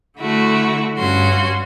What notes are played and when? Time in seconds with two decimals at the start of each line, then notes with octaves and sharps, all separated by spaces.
0.19 D3 A3 E4 F#4
0.99 G2 C#4 F#4 C6